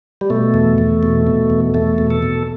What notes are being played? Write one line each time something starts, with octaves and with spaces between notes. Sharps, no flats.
G3
B2 A3
E2
E2
B2
B2
E2
E2 A3
B2
A4
B2